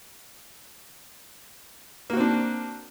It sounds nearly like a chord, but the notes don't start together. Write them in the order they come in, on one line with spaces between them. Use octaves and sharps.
A#3 F#4 C4 D4